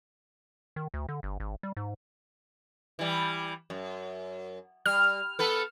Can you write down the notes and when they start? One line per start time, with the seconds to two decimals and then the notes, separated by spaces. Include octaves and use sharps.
0.76 D#3
0.94 D2
1.09 D3
1.23 G1
1.40 G#1
1.63 G3
1.77 G#2
2.99 E3 G3
3.70 F#2
4.86 G3 F6
5.39 B3 A4 B4